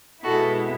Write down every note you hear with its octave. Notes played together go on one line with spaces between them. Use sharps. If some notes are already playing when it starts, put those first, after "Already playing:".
B2 G#3 B3 E4 F#4 A4